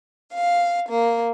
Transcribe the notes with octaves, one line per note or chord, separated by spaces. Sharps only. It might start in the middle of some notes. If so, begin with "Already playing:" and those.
F5
A#3